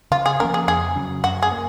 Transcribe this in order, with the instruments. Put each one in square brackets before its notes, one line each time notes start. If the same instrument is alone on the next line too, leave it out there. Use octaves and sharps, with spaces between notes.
[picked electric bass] C#3 [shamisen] F4
[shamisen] G#4
[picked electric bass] F3 A#3 C#4 [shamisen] A#4
[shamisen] G#4
[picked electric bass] F2 [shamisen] G#4
[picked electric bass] C#3 F#3 C#4
[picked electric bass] F#2 [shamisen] F#4
[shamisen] G#4
[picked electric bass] A#3